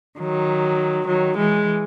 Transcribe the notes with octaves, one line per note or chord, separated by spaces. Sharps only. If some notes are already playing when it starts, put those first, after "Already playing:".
D#3 F#3
D#3 F#3
E3 G#3